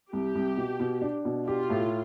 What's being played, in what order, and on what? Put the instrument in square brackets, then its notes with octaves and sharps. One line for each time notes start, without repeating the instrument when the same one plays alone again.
[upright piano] C2 [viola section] G4
[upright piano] C2
B2
B2
D4
B2
[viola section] F4 [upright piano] G4
[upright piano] A2